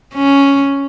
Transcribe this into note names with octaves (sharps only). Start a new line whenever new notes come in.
C#4